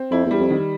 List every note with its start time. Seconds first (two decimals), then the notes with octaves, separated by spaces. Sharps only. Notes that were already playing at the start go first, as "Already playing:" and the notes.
Already playing: C4
0.11 F2 E4
0.25 E2
0.31 G3
0.40 F2
0.50 D#3